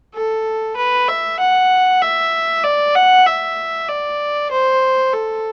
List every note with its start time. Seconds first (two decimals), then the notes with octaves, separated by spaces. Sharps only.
0.14 A4
0.76 B4
1.08 E5
1.40 F#5
2.02 E5
2.64 D5
2.95 F#5
3.26 E5
3.88 D5
4.51 C5
5.13 A4